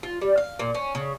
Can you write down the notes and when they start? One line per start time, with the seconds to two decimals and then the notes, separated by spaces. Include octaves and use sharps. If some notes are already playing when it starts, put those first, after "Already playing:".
0.03 F4
0.22 G3
0.38 F5
0.59 A#2
0.74 C#4
0.95 C#3